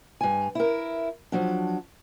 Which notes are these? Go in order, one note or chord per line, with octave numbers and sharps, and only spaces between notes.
G2 G#5
E4 A#4
F3 F#3 D4